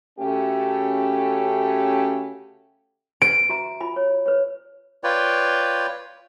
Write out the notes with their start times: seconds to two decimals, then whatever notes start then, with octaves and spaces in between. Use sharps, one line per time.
0.19 C#3 A3 C#4 F#4 G4 A4
3.22 B4 D7
3.50 F#4 E5 A#5
3.80 F4 G#5 B5
3.96 C#5
4.26 B4 C#5
5.04 F4 B4 C#5 D5 G5